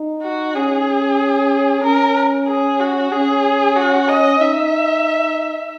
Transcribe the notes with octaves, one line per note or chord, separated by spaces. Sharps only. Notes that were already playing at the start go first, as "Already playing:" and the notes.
Already playing: D#4
F#4
C#4 G#4
C#4 A#4
G#4
F#4
C#4 G#4
F#4
D#5
D#4 E5